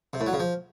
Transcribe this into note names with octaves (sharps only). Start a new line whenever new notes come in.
C3
A2
F#3
C#3
F3